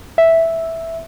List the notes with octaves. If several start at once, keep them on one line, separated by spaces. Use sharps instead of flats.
E5